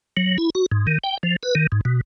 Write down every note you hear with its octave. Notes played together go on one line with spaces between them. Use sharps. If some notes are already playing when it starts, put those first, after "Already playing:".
F#3
E4
F#4
G#2
D#3
G5
F3
B4
D#3
G#2
B2